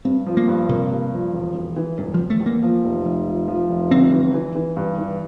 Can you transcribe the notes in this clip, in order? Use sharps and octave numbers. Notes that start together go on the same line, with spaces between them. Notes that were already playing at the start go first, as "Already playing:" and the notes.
G2 C4
F3
A#3
G2
C3 A#3
G2
F3
E1
E1
E3
E1 G2
F3
E1
A3
E2
A#3
F3
F1
F1
F3
F3
F1
G1 C4
E3
E3
E3
G2
E3